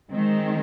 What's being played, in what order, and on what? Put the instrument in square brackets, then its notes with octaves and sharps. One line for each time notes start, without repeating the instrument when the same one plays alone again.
[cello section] D#3 G#3 C4